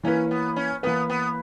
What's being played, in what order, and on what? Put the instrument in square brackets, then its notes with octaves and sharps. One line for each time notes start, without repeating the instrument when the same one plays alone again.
[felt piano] E3 A#3 E4 B4 [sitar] C#4
[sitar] B3
C#4
[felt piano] E3 A#3 E4 B4 [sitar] B3
[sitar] B3